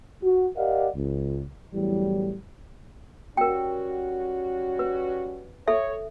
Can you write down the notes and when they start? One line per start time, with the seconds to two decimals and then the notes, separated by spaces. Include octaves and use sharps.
0.23 F#4
0.57 G4 A#4 D5 D#5 F5 F#5
0.96 C#2
1.73 E2 A2 E3 F#3 G3
3.37 G3 C#4 F#4 A#4 G5
4.79 B4
5.68 A4 C#5 E5